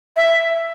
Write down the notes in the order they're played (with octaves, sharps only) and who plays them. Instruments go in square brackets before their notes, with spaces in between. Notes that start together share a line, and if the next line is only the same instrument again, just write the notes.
[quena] E5